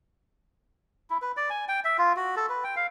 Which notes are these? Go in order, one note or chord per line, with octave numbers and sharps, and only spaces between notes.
E4
B4
D5
G#5
G5
E5
F4
F#4
A4
B4
G5
F5